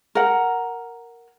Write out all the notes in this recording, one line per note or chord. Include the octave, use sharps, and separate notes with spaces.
A#4 F#5